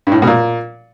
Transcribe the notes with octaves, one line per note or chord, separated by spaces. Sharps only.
G2
A2
G2
B2
A#2